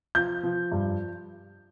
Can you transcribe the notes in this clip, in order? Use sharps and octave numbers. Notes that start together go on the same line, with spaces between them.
F3 G6
F3
G2